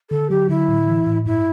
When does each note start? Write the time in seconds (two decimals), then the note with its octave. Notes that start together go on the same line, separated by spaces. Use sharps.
0.11 D3 A4
0.30 F#3 G4
0.49 D3 E4
0.68 A2
0.88 E3
1.07 A2
1.26 G2 E4